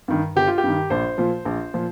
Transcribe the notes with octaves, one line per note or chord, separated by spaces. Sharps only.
G2 D#3
G1 G4
F4
G4
G2 D#3
A#1 C5
A#2 F3
A#1
A#2 F3